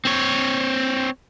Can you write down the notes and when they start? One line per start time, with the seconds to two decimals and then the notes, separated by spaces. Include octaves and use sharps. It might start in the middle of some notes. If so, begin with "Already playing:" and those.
0.05 C4 C#5